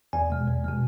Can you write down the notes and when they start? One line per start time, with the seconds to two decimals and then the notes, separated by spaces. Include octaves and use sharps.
0.13 E2 G#5
0.30 B2 G#3
0.47 E2
0.64 B2 G#3